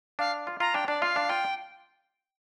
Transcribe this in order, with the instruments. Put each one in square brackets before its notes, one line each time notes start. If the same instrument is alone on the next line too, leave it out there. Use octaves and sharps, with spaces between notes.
[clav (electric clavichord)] D4 [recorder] F5
[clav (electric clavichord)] F4
[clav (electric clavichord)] F4 [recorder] A#5
[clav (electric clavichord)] D4 [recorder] G5
[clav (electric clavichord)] D4 [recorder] D5
[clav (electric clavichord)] F4 [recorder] F5
[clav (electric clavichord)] D4
[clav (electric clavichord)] F4 [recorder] G5